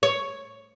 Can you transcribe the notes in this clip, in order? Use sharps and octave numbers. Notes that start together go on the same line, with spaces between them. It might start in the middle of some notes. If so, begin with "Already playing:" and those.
C#5